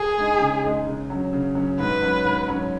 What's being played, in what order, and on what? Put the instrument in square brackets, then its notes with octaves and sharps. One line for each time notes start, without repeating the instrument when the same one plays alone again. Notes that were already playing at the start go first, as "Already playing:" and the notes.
Already playing: [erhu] G#4
[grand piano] G#3 D#4
C#3
G#3 D#4
C#3
F#3 C#4
C#3
F#3 C#4
[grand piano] G#2 [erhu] B4
[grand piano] F#3 C#4
G#2
F#3 C#4